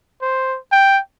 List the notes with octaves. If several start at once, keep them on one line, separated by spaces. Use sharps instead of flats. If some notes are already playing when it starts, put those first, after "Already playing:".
C5
G5